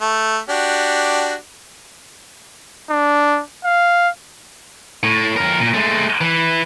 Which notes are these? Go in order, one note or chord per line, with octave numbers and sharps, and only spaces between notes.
A3
D4 F#4 G4
D4
F5
A2
F2 A#4
A#2
G#3 A3
E3